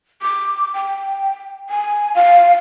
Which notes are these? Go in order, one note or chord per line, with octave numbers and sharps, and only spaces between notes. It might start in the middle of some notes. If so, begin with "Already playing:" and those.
D6
G5
G#5
F5